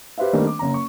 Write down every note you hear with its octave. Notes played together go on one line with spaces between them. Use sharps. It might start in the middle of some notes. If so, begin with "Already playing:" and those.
G4 B4 C5 E5 F5
D#3 G3 A3 A#3 C4 D4
D6
F#1 A#5
C#6